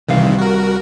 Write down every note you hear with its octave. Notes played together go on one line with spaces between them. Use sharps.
C2 C3 D#3 E3 G3 F5
F#4 A#4